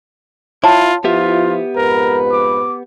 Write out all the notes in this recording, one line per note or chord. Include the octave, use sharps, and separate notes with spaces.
E4 F4 C#5 F#5 A5
F3 B3 E4 F4 G4 E5
F2 G#2 A#4 B4
D6